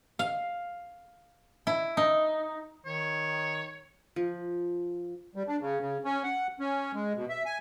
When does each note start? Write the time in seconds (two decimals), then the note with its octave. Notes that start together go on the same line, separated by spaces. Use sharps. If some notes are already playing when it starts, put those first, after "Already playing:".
0.19 F5
1.67 E4
1.97 D#4
2.86 D#3 C#5
4.16 F3
5.35 G3
5.48 D4
5.60 C#3
5.81 C#3
6.05 C#4
6.23 F#5
6.60 C#4
6.94 G#3
7.16 B2
7.29 E5
7.46 G#5